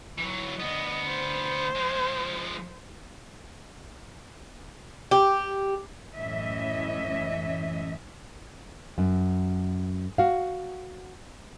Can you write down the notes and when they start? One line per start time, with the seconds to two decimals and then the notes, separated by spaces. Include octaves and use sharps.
0.18 E3 F#3
0.60 D2 B3 D#5
1.08 C5
1.75 F3 G#3
5.11 G4
6.16 F#2 A2 E3 C#4 D#5 E5
8.98 F#2
10.18 F#4 F5